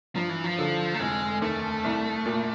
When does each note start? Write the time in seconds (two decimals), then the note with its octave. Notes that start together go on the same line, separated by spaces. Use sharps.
0.15 G2 F3
0.29 E3
0.44 F3
0.59 D3
0.94 A3
0.99 F1 G#3
1.42 D#2 A3
1.84 C2
2.26 A#2